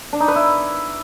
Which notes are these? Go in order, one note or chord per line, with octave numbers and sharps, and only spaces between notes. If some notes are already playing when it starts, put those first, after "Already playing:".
D4
D#4
B4
E4